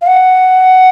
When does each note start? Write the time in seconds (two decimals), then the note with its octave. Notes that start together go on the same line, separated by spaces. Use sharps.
0.02 F5
0.07 F#5